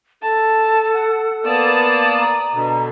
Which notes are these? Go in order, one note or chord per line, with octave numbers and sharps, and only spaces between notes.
A4 A5
F#5
A#3 B3 D5 A5 D#6
A#5
B2 D3